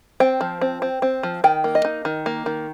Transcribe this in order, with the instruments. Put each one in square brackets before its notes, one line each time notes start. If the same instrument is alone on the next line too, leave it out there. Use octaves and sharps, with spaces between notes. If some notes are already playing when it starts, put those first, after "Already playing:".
[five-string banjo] C4 G5
F3
C4
C4
C4
F3
D#3 G5
A#3
D#5
D#4
D#3
A#3
D#3